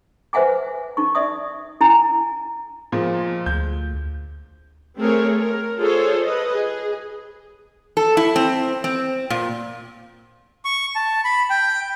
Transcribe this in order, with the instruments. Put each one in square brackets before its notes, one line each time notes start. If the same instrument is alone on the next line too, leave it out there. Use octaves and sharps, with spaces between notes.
[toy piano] B4 C5 E5 F#5 G#5 D6
D#4 C#6
D5 E5 D#6
E4 G#5 A#5
[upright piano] A#2 F3 G#3
[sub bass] D2 [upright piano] G6
[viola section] A3 C4 G#4 A#4 C#5
A#4
F4 G#4 A4 C5 C#5
B4 D#5
G#4
[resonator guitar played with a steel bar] A4
E4
C4
C4
A#2
[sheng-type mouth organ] C#6
A5
B5
G5